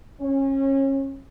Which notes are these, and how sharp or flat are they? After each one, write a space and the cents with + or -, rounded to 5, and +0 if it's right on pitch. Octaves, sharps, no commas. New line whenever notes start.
C#4 -30